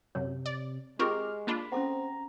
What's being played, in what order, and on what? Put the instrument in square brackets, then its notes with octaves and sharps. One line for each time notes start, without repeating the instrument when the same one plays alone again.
[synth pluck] F#2 [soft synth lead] C3 [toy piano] C#5
[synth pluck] D5
[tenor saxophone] G#3 [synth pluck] C4 F4 A#4 [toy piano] G4 G#4 D6 [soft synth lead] F6
[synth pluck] A#3 D4 F4 [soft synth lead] B5
[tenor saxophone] C4 [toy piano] C#4 A4 F#5 [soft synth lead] A#5